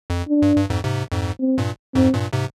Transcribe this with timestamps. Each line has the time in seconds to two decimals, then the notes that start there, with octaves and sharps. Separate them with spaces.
0.10 F2
0.28 D4
0.42 G2
0.56 G2
0.70 F2 G#2
0.84 G#2 C3
1.12 F2 G#2
1.40 C4
1.58 G2 A#2
1.95 F2 G#2 C4
2.14 G2 A#2
2.33 G#2 C3